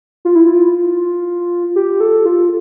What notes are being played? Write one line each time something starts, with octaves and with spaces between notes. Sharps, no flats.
F4
E4
F4
G4
A4
F4